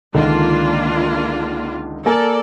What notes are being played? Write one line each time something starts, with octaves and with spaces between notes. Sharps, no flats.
C#2 D3 D#3 A#3 D4 F4
A#3 A4 A#4 D5 G#5